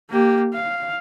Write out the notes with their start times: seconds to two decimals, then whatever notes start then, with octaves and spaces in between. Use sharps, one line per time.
0.10 A#3 G4
0.53 F5